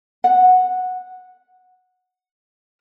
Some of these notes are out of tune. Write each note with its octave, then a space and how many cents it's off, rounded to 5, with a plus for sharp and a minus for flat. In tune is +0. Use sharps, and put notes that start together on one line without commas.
F#5 -10